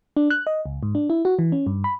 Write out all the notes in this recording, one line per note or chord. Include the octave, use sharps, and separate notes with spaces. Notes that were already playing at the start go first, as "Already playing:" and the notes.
D4
F#6
D#5
C#2
G#2
D4
E4
F#4
E3
C#4
G2
B5